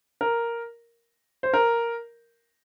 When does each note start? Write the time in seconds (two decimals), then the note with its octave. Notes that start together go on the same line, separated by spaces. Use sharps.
0.21 A#4
1.43 C5
1.54 A#4